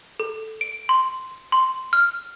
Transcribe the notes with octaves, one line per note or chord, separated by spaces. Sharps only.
A4
D7
C6
C6
F6